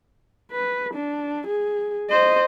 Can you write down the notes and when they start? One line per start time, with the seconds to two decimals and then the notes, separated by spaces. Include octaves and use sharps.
0.52 B4
0.94 D4
1.47 G#4
2.10 C5 D#5